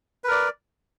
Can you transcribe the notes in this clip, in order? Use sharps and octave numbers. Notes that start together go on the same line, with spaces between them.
A#4 B4 D5